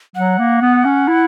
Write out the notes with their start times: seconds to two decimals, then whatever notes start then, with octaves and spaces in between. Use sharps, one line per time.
0.15 F#3 F#5
0.38 A#3
0.61 B3
0.85 C#4
1.08 E4